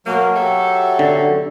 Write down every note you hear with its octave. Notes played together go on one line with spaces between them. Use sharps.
B2 F#3 A#3
G4 A4 E5
D3